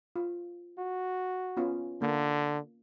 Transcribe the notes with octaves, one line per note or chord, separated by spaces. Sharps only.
F4
F#4
B3 C#4 F4
D3 A#3